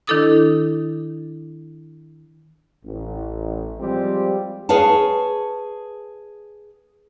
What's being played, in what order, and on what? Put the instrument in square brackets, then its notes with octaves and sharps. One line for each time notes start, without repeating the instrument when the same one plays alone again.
[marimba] D#3 D4 E4 A4 D6 D#6
[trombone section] A1
F3 G3 G#3 C4 F4 G4
[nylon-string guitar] G#4 B4 C#5 F5 A5